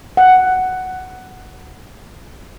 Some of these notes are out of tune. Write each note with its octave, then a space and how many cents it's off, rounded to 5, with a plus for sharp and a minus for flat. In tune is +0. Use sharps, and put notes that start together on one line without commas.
F#5 +5